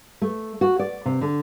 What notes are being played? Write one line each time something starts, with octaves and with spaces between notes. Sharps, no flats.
A3
F#4
D5
C3
D3